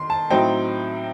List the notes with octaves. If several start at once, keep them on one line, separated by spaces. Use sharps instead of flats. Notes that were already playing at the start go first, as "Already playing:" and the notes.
Already playing: D#3 C6
A5
A2 F#3 C4 D#4 G5